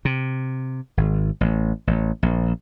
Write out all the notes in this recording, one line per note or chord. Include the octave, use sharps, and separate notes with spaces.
C3
G#1
A1
A1
A#1